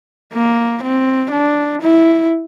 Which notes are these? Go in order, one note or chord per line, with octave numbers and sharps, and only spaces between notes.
A#3
C4
D4
E4